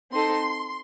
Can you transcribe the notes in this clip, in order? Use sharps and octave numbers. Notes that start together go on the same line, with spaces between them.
C4 D#4 A4 C6